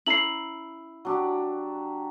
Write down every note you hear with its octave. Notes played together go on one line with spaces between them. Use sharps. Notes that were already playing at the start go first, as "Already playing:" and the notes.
C#4 E4 A#5 C7 F#7
F#3 D4 G4